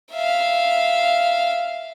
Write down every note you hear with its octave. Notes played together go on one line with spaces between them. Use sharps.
E5 F5